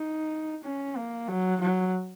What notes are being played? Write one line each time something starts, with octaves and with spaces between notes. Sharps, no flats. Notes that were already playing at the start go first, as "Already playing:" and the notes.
Already playing: D#4
C#4
A#3
F#3
F#3